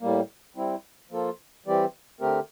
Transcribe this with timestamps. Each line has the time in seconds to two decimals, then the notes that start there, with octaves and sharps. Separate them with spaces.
0.01 A2 G3 A#3
0.56 G3 C4 E4
1.10 F3 A#3 F4 A4
1.66 E3 G3 C4 G4 D5
2.20 D3 A3 C4 G4 A#4